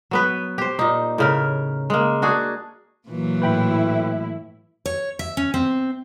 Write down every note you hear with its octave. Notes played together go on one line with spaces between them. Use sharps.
F#3 B3 B4
G4 C5
A#2 D#4
A2 C#3 A#4
G#3 A#3
D4 F#4 G#4
A#2 E3 F#3
A2 E4 B4 G5 B5
C#5
E5
C#4
C4